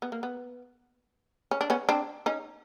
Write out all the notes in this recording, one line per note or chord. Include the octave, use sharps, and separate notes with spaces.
B3
A#3
B3
C#4
D4
B3 C#4
C4 D4
C#4 D#4